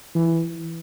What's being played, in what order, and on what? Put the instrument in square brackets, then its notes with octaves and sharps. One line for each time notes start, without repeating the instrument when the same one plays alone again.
[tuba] E3